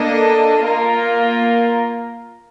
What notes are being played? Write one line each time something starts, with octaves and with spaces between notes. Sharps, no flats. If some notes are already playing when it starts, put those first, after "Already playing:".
Already playing: A#3 D4 A4 D#5
A#3 F4 A#4